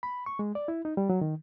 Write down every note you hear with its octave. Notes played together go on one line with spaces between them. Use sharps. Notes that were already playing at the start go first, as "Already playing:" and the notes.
B5
C#6
G#3
D5
E4
D#4
G3
F#3
D#3